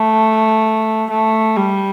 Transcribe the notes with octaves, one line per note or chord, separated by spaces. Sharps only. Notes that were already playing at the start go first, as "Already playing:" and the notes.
Already playing: A3
A3
G3